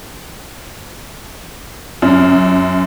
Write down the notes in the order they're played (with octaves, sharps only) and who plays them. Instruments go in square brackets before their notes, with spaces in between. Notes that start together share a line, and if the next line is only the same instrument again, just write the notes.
[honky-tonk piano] F#2